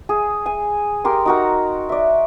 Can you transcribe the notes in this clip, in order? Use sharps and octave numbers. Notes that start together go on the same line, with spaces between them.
G#4
G#5
G4 A#4 C6
D#4 F#4 A#4
D5 E5